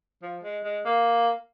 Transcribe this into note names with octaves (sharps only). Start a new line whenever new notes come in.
F3
G#3
G#3
A#3